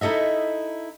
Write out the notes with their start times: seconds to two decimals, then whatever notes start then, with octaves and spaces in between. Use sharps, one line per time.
0.01 D#4 E4 A4 D#5 E5